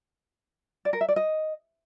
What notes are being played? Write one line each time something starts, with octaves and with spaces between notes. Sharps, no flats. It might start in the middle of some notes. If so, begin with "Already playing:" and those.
D5
A#4
E5
D5
D#5